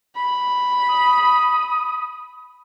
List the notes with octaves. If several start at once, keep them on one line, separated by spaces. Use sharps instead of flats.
B5
D#6